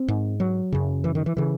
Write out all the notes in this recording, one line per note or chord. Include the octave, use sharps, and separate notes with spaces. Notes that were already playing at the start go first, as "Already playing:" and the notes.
Already playing: C4
G#2
F#3
F#2 C#3
E3
D#3
E3
C#3 E3